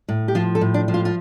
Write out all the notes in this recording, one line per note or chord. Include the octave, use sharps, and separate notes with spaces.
A2
G4
F3 F4
A4
A2
D4
F3
F4
F4